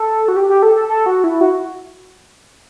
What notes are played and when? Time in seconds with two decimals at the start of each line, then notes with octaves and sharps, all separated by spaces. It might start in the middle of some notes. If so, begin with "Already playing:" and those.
Already playing: A4
0.28 F#4
0.36 G4
0.49 G4
0.63 A4
0.76 A4
0.89 A4
1.06 F#4
1.24 E4
1.41 F#4